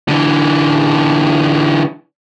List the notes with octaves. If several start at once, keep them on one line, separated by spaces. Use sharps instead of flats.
D3 E3